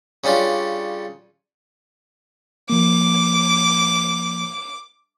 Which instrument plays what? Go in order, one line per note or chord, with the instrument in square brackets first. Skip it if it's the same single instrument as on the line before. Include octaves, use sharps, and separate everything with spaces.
[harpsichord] C#3 G3 C#4 D4 F4
[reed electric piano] F3 A#3 [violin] D6